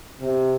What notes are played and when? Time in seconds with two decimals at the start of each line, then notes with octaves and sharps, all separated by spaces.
0.20 C3